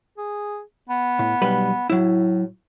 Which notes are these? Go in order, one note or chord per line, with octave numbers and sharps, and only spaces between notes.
G#4
B3
A2
B1 G3 B4
A2 F#3 E4